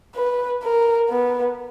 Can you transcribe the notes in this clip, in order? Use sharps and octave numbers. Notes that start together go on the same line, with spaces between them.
B4
A#4
B3